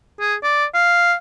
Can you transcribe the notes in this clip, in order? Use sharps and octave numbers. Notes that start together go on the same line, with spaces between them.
G#4
D5
F5